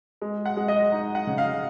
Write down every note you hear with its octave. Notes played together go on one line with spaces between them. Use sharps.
G#3
F#5
G#3
D#5
D#4
F#5
C#3
F5